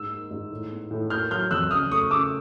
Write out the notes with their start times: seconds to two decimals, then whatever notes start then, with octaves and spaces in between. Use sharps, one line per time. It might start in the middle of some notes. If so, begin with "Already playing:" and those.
Already playing: G#2 E6
0.10 A#3
0.31 G#2
0.51 A2
0.71 B3
0.91 A2
1.10 A#3 F6 G6
1.31 F#3 F6 G6
1.51 F2 E6 F#6
1.71 C#3 D#6 F6
1.91 A3 C#6 D#6
2.11 C#3 D6 E6